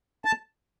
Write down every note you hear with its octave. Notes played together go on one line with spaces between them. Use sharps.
A5